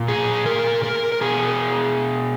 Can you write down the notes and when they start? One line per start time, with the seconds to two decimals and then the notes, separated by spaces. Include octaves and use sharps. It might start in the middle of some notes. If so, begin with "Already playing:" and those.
Already playing: A#2
0.08 G#4
0.46 A#4
0.84 A#4
1.12 A#4
1.21 B2 G#4